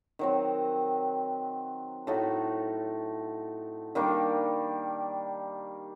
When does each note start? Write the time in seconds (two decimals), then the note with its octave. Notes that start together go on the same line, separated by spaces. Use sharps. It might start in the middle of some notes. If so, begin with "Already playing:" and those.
0.19 D#3 F#3 C4
2.07 A2 A3 D#4 F#4
3.95 D#3 G3 A#3 D4